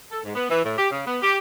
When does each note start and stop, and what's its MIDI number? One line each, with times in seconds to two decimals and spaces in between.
0.10 0.20 69
0.23 0.34 44
0.35 0.48 59
0.50 0.61 52
0.64 0.74 45
0.77 0.88 67
0.91 1.02 49
1.06 1.17 59
1.22 1.37 67